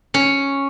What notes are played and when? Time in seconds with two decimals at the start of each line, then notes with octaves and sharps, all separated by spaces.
0.14 C#4